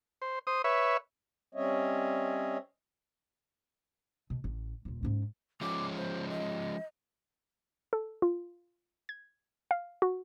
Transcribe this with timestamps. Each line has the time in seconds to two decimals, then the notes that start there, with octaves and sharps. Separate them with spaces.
0.22 C5
0.47 C5 D#6
0.64 B4 C#5 E5
1.55 G3 C4 C#4 C#5 D#5 E5
4.30 B2
4.44 A1
4.85 D#1 A#2
5.03 G#2 C#4
5.61 F3 G#3 C#4 D6
5.96 C5
6.29 D#5
7.93 A4
8.22 F4
9.09 G#6
9.71 F5
10.02 F#4